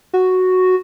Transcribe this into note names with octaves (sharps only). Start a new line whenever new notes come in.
F#4